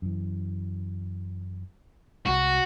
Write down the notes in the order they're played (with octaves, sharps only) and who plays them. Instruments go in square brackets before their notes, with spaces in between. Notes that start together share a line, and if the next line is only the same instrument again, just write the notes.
[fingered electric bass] F#2 E3
[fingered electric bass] C2 G#3 [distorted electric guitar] F#4